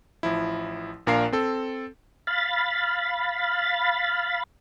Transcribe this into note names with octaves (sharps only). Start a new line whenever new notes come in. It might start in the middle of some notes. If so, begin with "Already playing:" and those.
A1 F3 E4
A#1 A#2 D4 A#4 F5 C7
C4 A4
F5 B5 A6